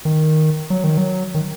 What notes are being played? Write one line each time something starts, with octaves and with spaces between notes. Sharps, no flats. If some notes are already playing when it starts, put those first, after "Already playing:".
D#3
F#3
D#3
F#3
D#3